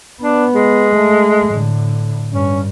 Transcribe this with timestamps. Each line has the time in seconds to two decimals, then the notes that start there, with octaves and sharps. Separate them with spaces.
0.22 B3 D4
0.54 G#3
0.94 A3
1.50 A2 D3
2.31 G2 C#4